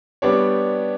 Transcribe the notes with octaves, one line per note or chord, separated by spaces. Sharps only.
G3 B3 D4 G4 C#5